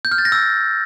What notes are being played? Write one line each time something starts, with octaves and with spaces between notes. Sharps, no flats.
G6
F6
A6
A#6
E6